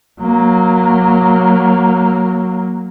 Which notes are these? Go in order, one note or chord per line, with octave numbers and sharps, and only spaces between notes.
F#3 A#3